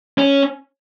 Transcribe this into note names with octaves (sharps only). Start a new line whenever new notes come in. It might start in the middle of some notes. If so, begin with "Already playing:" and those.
C#4